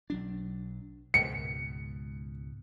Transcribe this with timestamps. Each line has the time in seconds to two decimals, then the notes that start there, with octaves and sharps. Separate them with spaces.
0.10 B1 F#3 D4
1.14 C#2 G#2 B2 C#7